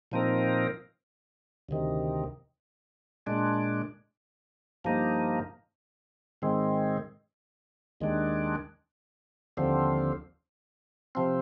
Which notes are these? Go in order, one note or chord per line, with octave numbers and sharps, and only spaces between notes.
A#2 F3 C4 D#4 A#4
D2 C3 D#3
A#2 G#3 D4
G2 F3 A#3 D#4
G#2 D#3 G#3 C4
D#2 D#3 G#3 D4
D#2 D3 F3 C4
C3 F3 C4